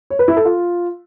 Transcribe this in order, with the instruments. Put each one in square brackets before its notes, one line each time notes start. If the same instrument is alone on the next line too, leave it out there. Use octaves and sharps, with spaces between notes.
[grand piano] C#5
B4
E4
A4
F4